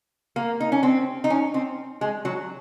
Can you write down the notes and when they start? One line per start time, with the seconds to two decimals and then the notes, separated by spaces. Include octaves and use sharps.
0.36 A#3
0.60 D#4
0.72 C#4
0.83 C4
1.24 D#4
1.30 C#4
1.54 C4
2.01 G#3
2.25 F#3